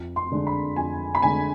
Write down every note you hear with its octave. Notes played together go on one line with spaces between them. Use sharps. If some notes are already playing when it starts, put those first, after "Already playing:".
Already playing: F2
C6
D3 G#3 D4
B5
F2 G#5
B5
D3 G#3 D4 G#5